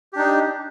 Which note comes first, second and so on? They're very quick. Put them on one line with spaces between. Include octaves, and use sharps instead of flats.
G4 D4 D#4